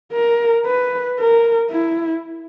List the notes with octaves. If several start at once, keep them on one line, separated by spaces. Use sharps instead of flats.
A#4
B4
A#4
E4